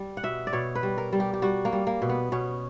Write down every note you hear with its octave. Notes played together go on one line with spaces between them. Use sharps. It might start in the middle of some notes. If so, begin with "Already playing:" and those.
Already playing: G3
F#5
B2 E5
D5
B2 C#5
B4
G3
A#4
G3
G4
G4
G3 F#4
A#3
G3
A#3
B2
B3
B2 C#4